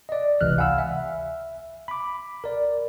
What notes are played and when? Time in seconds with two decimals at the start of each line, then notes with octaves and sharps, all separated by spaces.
0.09 D5 D#5
0.41 G1 C#2 C3 E3 F6 F#6
0.58 F5 F#5 G#5 B5 E6 F6
0.78 E5
1.88 B5 D6
2.44 A#4 D5